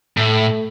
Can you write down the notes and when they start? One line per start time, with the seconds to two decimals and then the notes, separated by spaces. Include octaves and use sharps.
0.17 A2 A3